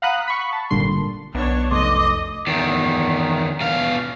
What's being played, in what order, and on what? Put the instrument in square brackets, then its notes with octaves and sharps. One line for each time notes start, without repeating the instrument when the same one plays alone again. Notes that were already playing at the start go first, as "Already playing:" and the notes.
[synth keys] F5 F#5 A#5 B5 D#6 F#6
B5 C#6
A5
G#1 A#2 D3 G3 C6
[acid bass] B1 [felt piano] B3 [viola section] D4 C#5
[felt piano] F1 A3 C6 [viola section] D#5 [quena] D6
[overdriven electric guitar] E2 D#3
B2 F5